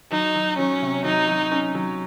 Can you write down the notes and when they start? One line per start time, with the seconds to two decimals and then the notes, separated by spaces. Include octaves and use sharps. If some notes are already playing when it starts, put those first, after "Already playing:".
0.12 F#3 D#4
0.35 F#3
0.58 F#3 C#4
0.82 C3
1.05 F#3 D#4
1.29 F#3
1.51 C#4
1.75 F#3